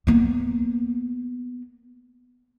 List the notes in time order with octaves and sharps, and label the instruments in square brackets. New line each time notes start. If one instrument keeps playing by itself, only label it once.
[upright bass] A#3 B3